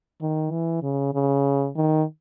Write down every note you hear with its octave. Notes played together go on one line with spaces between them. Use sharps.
D#3
E3
C#3
C#3
D#3